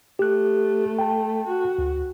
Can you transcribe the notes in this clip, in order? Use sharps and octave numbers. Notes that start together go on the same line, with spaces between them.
A3 G4 F#6
G5 A5
F#4
D2